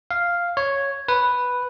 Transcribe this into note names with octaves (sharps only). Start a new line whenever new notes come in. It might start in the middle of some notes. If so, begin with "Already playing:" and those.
F5
C#5
B4